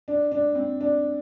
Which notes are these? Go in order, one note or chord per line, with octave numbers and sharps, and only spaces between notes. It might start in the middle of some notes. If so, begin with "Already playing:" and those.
D4
D4
C4
D4